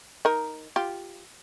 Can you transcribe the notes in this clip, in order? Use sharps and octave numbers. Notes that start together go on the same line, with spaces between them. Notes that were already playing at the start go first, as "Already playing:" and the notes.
D#4 A#4
F4 G4